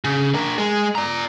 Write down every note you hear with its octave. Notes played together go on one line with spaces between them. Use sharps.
C#3
D4 A#4
G#3
D5 A#5